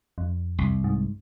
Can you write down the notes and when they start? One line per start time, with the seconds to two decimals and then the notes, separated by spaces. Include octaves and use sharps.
0.18 F2
0.58 C2
0.84 G#2